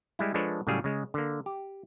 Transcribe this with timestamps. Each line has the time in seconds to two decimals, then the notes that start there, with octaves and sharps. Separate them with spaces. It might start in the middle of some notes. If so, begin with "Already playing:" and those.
0.19 G3 G#3 E4
0.34 F3 G#3 D4 A4 B4 C#5
0.67 A2 C#3 F#3 G3 G#4 F5
0.84 C#3 G#3
1.14 D3 A#3
1.46 G4